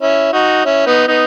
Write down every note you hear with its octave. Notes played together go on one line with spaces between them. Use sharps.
C#4 E4
D#4 F#4
C#4 E4
B3 D#4
B3 D#4